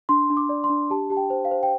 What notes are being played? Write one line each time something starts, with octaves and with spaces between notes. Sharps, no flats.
D4 C6
D4
D6
D5
C6
D4
G4 A5
G4 A5
G5
C5
F5
C5
G5